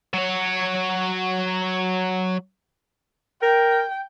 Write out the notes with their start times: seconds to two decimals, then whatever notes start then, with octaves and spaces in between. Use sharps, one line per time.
0.14 F#3 C#5
3.42 A#4 G5